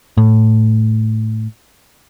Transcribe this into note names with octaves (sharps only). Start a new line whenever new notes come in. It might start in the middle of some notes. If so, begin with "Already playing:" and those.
A2